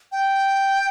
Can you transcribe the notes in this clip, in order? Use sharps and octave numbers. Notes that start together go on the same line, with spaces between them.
G5